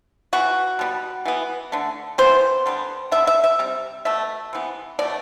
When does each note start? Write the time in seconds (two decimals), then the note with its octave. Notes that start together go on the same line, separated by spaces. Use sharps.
0.33 E3 B3 F#4
0.79 B2 G3 B3
1.25 E3 B3
1.72 D3 A3
2.18 C3 E3 B3 C5
2.66 D3 G3 B3
3.11 D3 G3 B3 E5
3.27 E5
3.44 E5
3.59 C3 G3
4.05 B2 A3 E5
4.53 C3 E3 B3
4.99 B2 A3 D5